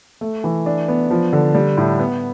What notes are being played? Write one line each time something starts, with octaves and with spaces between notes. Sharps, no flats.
A3
E3
D4
B3
F3
D3
G3
A2
B3